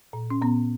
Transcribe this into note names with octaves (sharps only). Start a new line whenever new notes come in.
A#2
C#4
A#2 B3